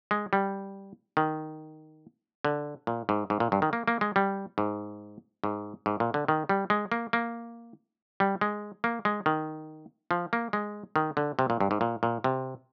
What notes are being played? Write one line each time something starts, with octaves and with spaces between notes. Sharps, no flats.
G#3
G3
D#3
D3
A#2
G#2
G#2
A#2
G2
D#3
A#3
A#3
G#3
G3
G#2
G#2
G#2
A#2
D3
D#3
G3
G#3
A#3
A#3
G3
G#3
A#3
G#3
D#3
F3
A#3
G#3
D#3
D3
C3
A#2
G2
G#2
A#2
A#2
C3